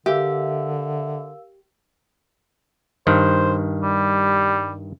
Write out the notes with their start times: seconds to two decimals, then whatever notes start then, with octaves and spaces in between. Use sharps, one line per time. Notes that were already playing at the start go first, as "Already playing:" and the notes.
0.06 D3 G4 A#4 E5 F5 E6
3.07 G2 D#3 C5
3.81 G3